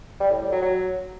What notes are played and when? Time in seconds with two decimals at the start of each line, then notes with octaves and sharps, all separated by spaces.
0.20 G3
0.31 A2
0.41 G3
0.52 F#3
0.62 F#3